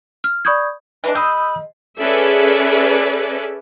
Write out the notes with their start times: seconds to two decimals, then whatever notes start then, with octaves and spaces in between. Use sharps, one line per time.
0.24 F6
0.45 D5 B5 C#6 D#6 G6 G#6
1.04 E3 G#3 D4 B4
1.15 G#3 B5 D#6 E6 G6
1.98 C#4 G#4 A4 B4 D5 E5